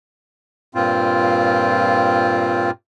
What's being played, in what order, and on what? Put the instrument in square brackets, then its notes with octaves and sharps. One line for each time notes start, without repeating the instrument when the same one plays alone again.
[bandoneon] G2 A#2 C4 F4